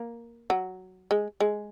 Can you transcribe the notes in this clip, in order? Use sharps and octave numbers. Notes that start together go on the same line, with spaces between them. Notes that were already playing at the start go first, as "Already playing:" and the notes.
Already playing: A#3
F#3
G#3
G#3